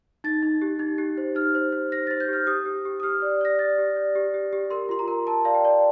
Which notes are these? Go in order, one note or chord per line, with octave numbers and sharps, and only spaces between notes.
D#4 A6
D#4
G4
D#4
G4
C5
D#4 F6
C5
C5
C5 A#6
C5 A6
G6
G4 F6
G4 D#6
G4
G4
D#6
G4 F6
D5
D5 A#6
D5 A6
G4
D5
G4
G4
G4
A#4 C6
F4 C6
A#5
A#4
A#4 A5
D5 F5
G5
D5